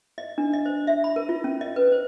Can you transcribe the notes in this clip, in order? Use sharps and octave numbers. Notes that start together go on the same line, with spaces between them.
D#5
D4
D#5
C5
E5
B5
A#4
F4
C#4
D#5
B4
C5